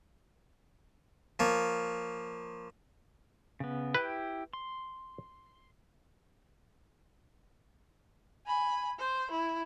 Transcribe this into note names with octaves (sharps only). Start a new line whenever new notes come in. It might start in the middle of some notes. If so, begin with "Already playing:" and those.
F3 A#3 C#5
C#3 B3
E4 G4 B4 G5
C6
G#5 B5
C5
E4